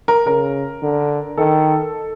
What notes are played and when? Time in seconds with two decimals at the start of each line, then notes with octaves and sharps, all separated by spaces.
0.08 A#4
0.26 C#3 A#4
0.82 D3
1.37 D#3 A4